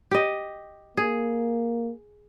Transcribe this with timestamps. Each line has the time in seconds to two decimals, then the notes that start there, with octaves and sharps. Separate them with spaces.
0.11 G4 D#5
0.97 A#3 G#4